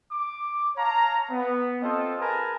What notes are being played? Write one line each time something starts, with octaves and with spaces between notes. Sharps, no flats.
D6
C#5 F5 A5 A#5
B3
C4 F4 A4 C5 D#5
G#4 A#4 B4 G#5 A5